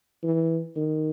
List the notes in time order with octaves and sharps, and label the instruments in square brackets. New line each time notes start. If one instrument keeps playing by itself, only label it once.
[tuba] E3
D#3